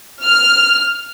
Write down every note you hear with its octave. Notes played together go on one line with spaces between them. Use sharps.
F6